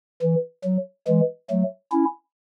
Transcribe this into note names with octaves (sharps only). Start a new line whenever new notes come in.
E3
F#3
E3 G#3
F#3 A3
C#4 E4